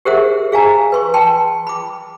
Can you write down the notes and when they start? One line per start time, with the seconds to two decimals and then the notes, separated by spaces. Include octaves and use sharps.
0.05 G4 G#4 A#4 C5 E5 F#5
0.52 G#4 F5 G#5 A#5
0.92 B4 C6 C#6
1.14 G5 A5 C6
1.67 B5 D6